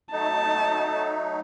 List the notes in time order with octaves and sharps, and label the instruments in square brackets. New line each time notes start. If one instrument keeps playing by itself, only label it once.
[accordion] F#3 A3 D#4 [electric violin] A5